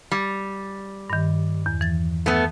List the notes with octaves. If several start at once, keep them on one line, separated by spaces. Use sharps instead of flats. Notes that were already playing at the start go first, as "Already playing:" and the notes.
G3
G2 D#3
E2
E3 A6
A3 B3